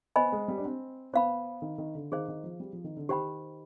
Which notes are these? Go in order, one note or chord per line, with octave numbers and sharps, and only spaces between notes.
B3 C5 D#5 G#5 B5
G#3
G3
D4
C4
B3 C5 F5 B5
D#3
D#3
D3
D#3 G#4 C5 F5
D#3
F3
G3
F3
D#3
D3
D#3 G4 C5 G5 B5